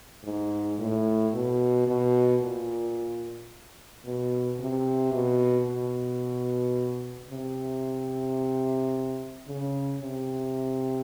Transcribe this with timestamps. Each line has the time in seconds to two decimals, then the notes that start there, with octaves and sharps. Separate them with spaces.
0.25 G#2
0.79 A2
1.34 B2
1.87 B2
2.42 A#2
4.05 B2
4.60 C3
5.13 B2
5.67 B2
7.30 C3
9.47 C#3
10.02 C3